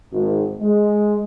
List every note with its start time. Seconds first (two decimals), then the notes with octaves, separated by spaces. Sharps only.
0.11 G#1
0.59 G#3